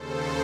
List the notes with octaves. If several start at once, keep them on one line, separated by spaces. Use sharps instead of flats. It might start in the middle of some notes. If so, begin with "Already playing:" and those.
Already playing: D#2 C#3 A4 C5